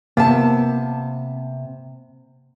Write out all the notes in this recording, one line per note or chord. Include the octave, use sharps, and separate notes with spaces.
C3 A#3 B3 A5